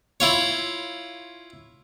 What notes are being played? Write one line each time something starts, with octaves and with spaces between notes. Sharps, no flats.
E4 F4 C#5